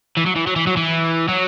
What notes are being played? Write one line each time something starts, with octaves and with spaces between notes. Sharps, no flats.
E3
F#3
E3
F#3
E3
F#3
E3
F#3